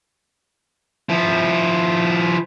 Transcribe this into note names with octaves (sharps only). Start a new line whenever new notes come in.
F3 E4